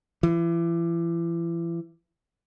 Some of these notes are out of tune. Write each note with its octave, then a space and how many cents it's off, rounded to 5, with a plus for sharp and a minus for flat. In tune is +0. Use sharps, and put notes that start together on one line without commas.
E3 +35